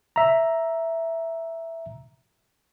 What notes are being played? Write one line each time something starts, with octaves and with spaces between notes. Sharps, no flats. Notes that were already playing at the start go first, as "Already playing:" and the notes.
E5 A#5